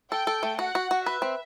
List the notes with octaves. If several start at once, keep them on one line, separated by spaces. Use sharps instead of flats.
A4 G5
A4
A3
F#4 F#5
F#4
F#4
B4 E5
C4